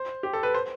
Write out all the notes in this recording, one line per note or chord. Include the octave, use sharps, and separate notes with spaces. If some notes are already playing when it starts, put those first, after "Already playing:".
Already playing: C5
G4
A4
B4
C5